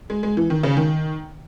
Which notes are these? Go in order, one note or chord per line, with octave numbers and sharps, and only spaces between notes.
G#3
G#3
E3
D#3
C#3
D#3